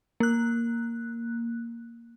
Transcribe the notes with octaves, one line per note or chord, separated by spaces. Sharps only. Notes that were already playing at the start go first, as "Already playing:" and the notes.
A#3 F#6